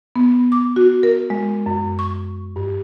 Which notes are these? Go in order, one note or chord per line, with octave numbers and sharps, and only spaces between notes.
B3
D6
F#4
A#4
G#3
F#2
C#6
G2